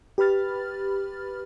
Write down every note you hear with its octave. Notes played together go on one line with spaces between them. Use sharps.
G4 B4 B5 F6 A6